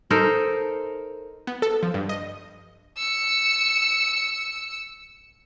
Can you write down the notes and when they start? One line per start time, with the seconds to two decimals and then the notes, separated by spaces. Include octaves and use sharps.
0.10 D#4 A4 A#4 C5
1.47 B3
1.62 A4
1.83 F3
1.94 G2
2.09 D#5
2.98 E6 C#7